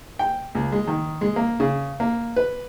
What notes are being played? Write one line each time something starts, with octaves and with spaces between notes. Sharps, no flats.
G5
C#2
G#3
D#3
G#3
A#3
C#3
A#3
B4